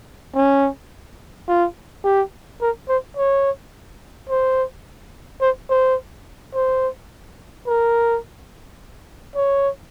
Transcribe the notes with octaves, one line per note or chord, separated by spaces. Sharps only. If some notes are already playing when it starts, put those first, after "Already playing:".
C#4
F4
G4
A#4
C5
C#5
C5
C5
C5
C5
A#4
C#5